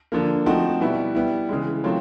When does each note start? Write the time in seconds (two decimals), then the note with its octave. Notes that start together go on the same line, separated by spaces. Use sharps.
0.12 D3 F3 A#3
0.46 F3 A3 C4 D#4 F#4
0.81 B2 G3 B3 E4
1.15 G3 B3 E4
1.49 C#3 E3 G#3
1.84 D#3 F#3 A3 C4 F4